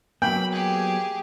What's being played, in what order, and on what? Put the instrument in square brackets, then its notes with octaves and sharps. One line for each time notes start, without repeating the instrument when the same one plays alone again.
[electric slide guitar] F#3 A#3 B3 [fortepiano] G5 [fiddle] B5
[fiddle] G4 G#4